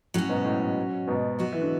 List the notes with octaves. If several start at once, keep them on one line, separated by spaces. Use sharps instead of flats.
A2 F#3 C#4 F#4
G#2 B2
A2
G#2 B2
F#3 B3 F#4
E3
D3